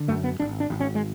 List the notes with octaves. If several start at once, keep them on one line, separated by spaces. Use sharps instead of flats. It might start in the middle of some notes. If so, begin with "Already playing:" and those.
Already playing: D3
F#2 A3
B3
G#1 D4
D4
G#1
C#4
G#3